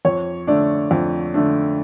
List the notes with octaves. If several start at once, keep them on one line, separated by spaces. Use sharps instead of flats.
F2 C#5
D3 A3 D4 D5
F2
D3 A3 D4